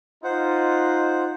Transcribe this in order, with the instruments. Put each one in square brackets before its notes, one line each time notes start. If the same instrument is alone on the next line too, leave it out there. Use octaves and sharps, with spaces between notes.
[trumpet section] D#4 F4 [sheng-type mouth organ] C5 F#5